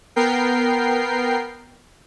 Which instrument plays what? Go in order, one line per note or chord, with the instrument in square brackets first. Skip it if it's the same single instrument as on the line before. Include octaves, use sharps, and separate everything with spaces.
[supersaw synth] B3 A#4 G5 C7